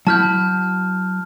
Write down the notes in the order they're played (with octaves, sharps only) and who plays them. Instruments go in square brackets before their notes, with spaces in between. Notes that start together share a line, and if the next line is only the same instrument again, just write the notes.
[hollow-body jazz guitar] F#3 E4 B5 [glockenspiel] A5 F6 G6